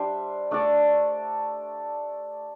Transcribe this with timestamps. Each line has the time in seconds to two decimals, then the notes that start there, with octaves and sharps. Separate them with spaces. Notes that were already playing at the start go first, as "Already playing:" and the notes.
Already playing: G3 D4 C5 E5
0.51 A3 D4 A4 D5